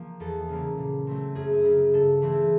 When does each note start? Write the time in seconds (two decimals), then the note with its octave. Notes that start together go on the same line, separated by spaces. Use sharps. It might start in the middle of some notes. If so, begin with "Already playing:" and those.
Already playing: F3 A#3
0.20 E2 A4
0.49 C#3 F#3 A#3
0.78 A#2
1.07 F#3 A3 C4
1.35 F#2 G#4
1.64 C#3 F#3
1.94 G2 A4
2.22 E3 A3 C4 G#4